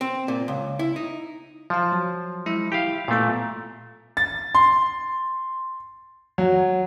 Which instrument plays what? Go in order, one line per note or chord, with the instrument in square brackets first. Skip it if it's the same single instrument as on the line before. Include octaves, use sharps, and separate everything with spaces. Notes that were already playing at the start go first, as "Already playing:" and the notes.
[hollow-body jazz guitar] C4
A#2
C#2
E4
D#4
[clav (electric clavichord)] F3 [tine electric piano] F5 A5
[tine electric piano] F#3
G#3 E4 E5
[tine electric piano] E4 [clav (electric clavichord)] G4 F5
[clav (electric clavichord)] A#2 A3 [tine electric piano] B3 F4
[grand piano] A6
C6
F#3